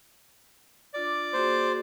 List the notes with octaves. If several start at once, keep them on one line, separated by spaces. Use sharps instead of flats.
D4 F4 D5 D6
A#3 F#4 G#4 C5